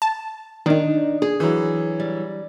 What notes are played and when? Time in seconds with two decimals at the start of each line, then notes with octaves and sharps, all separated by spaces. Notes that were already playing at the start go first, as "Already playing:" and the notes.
0.02 A5
0.66 D#3 D4 D#4
1.22 G#4
1.40 E3 F#3
2.00 G3